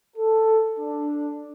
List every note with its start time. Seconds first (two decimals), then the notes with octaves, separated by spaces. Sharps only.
0.17 A4
0.79 D4